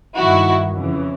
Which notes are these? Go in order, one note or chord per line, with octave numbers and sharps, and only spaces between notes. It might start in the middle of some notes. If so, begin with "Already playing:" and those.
G2 D#3 E4 F#4
F2 C#3 E3